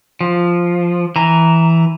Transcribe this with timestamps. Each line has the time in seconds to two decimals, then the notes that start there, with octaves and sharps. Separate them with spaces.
0.21 F3
1.16 E3 A#5